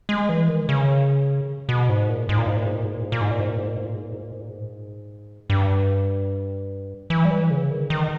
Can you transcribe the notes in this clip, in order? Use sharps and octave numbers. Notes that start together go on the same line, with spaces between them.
G#3
E3
D#3
C#3
B2
G#2
A#2
G#2
A#2
G#2
A#2
G#2
A#2
G#2
A#2
G#2
A#2
G#2
A#2
G#2
A#2
G#2
A#2
G#2
A#2
G#2
A#2
G#2
A#2
G#2
A#2
G#2
G2
E3
G3
E3
C#3
D#3
D#3